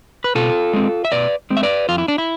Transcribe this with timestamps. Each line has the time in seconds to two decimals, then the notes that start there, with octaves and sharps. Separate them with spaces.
0.24 B4
0.35 B2 F4 A4
0.74 G#3 C4
1.05 E5
1.12 B2 B4 D5
1.50 G#3 C4
1.57 E5
1.63 B4 D5
1.89 F2 F4
1.98 E4
2.08 D4
2.18 E4